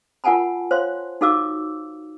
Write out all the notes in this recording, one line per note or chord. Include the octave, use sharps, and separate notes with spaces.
F4 A#4 F#5 G#5 A5 B5
C5 C#5 F5 C6
D#4 F#4 A4 F5 D6 E6